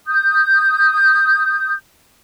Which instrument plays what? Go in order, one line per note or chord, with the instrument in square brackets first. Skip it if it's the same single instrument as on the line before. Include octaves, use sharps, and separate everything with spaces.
[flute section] D#6 G6